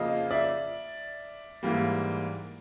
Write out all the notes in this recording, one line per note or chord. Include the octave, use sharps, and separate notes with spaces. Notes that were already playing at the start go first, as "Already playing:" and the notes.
Already playing: F2 C#3 F3 A#3 D#5 F5
D5 E5
G#2 E3 G3 A#3